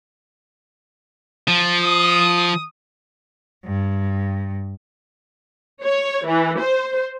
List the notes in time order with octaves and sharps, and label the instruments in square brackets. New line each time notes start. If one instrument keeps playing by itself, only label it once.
[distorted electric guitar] F3
[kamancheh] D#6
[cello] G2
[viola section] C#5
E3
C5